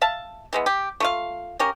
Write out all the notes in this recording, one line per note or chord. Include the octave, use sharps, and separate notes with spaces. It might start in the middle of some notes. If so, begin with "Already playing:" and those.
E5 F5 A5
E3 G#3 B3
G4
A3 F4 F5
A#3 C#4 G4 A#4